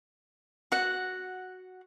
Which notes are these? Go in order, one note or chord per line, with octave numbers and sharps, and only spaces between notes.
F#4 F#5